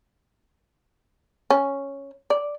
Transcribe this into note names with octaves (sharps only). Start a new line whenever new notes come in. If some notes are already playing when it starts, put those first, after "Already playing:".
C#4
D5